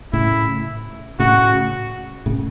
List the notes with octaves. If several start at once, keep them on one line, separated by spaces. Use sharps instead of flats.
A2 C#3 E4
A2 C#3 F#4
A2 C#3